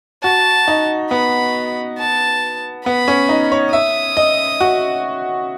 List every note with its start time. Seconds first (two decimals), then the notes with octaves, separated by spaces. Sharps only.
0.24 F#4 A5
0.68 D#4
1.11 B3 B5
1.99 A5
2.86 B3 B5
3.08 C#4
3.29 D#4
3.52 C#5
3.72 E5 D#6
4.17 D#5
4.60 F#4